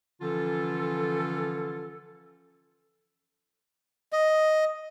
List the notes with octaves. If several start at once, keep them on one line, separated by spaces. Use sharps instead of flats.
D3 E3 F3 C#4 F4 A4
D#5